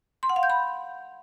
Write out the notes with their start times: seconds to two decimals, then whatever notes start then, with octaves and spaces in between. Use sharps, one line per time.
0.23 C6
0.29 F#5
0.36 F5
0.43 G6
0.50 B5